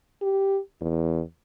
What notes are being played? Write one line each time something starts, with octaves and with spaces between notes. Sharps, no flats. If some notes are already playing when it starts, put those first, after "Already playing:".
G4
E2